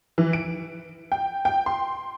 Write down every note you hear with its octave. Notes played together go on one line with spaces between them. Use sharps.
E3
D7
G5
G5
C6